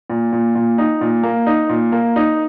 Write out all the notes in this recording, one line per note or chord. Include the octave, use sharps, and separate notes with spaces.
A#2
A#2
A#2
D#4
A#2
A#3
D#4
A#2
A#3
D#4